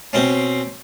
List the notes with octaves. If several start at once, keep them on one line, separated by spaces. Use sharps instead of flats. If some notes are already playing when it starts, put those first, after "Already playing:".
B2 C4 C#4